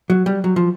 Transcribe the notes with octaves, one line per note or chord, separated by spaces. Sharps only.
F#3
G3
F#3
F3